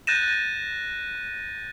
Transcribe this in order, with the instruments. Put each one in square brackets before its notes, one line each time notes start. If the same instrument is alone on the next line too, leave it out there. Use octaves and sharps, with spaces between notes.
[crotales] F#6 G6 A6 A#6 D#7 E7